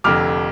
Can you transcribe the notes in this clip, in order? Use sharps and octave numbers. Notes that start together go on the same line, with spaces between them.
F1 F2 D3 D6 F6